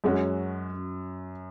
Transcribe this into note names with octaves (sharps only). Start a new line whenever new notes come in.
F#2 G#3 C#4 F#4